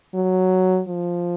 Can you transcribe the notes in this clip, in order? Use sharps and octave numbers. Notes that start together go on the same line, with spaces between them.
F#3
F3